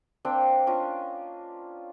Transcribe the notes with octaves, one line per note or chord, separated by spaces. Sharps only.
A#3 C4 D4 G5
C#4 D4 F4 D#5